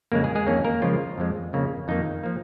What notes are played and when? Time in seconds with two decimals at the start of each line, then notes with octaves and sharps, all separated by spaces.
0.12 F2 C#3 G#3 A#3 A#4
0.24 G#3 G#4
0.35 G#3 G#4
0.47 F2 D#3 A#3 C#4 C#5
0.65 A#3 A#4
0.82 C#3 F3 G#3 F4
1.18 F2 F3 G#3
1.53 F2 C#3 A#3
1.88 F2 D#3 A#3 D#4
2.23 F3 A#3